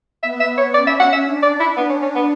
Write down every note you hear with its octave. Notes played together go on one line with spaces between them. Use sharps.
B3 E5
E5
C#5
C#4 D5
E5
F#5
E5
D4
D5
E4
B3
C#4
C#4
B3